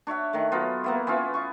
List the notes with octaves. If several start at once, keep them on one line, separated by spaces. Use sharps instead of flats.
D4 C#5 E5 F#5
D#3 A3
F#3 B3 F4
A#3 B3 E4
B3 C#4 E4 F4
E4 C#6